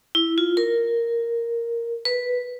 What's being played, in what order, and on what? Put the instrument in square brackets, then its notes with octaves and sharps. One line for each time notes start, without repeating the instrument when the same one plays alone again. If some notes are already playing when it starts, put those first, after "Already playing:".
[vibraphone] E4
F4
A#4
B4